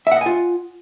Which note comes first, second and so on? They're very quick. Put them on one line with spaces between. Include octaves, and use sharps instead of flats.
E5 F#5 D#5 G#5 F4